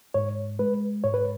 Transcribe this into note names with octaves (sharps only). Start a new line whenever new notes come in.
G#2 C#5
G#3 B4
G#2 C#5
B4